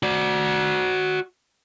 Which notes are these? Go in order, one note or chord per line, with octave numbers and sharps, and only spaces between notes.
F#4 D5